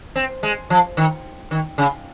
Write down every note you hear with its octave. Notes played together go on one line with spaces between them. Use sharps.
C4
G#3
F3
D#3
D#3
C#3